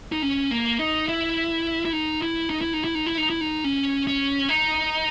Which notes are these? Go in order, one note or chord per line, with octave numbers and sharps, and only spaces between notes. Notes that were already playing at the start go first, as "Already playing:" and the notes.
D#4
C#4
A#3
D#4
E4
E4
D#4
E4
D#4
E4
D#4
E4
D#4
E4
D#4
E4
D#4
C#4
C#4
D#4